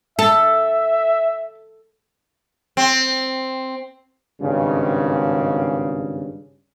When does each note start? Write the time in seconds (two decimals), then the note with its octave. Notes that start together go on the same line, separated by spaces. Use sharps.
0.19 A4 E5
2.77 C4
4.41 G#1 G2 C#3